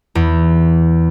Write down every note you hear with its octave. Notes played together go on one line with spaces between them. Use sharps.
E2